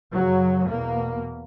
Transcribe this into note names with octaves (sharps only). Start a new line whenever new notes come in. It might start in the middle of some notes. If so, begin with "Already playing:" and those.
F#2 C#3 F#3
E2 B2 A#3